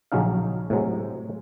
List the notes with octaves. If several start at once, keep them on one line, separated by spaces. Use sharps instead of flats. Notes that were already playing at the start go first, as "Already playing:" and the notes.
A#1 C#3 F#3 C#4 D#4 F5
A2 C3 F#3 G#3